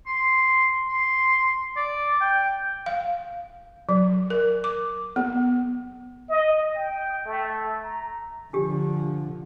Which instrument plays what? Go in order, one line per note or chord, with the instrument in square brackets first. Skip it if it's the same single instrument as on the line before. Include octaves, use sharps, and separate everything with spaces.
[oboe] C6
C6
D5
G5
[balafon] F5
F#3
A#4
D6
B3
[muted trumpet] D#5
G5
A3
A#5
[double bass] D3 F3 [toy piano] D4 G4